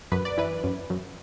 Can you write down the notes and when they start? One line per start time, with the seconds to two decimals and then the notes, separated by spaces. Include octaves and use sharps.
0.12 F#2 B4
0.25 D5
0.38 E3 B4
0.64 F#2
0.90 F#2